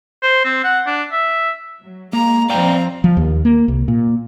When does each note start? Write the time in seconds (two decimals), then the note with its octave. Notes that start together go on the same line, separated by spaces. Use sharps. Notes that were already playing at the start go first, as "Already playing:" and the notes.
0.23 C5
0.45 C4
0.64 F#5
0.86 D4
1.12 E5
1.81 F#3
2.13 G#3 A#3 A#5
2.50 F2 C4 D5 F5 G5 A#5
3.04 F3
3.17 D#2
3.45 A#3
3.68 C2
3.88 A#2